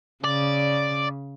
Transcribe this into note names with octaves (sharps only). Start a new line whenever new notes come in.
C#3 D5